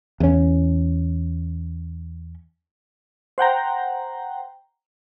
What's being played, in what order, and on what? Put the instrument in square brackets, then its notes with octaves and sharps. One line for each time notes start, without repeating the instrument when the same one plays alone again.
[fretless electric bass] E2 C#4
[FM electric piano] C5 F#5 G5 A#5